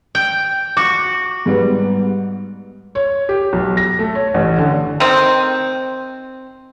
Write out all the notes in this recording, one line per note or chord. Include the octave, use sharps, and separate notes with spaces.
G5
F#4 D6
G#2 G3 B3
C#5
G4
B1
A#6
A3
C#5
A1
D3
D#3 C4